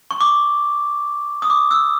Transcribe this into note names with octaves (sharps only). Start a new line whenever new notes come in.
C#6
D6
D#6
D6
E6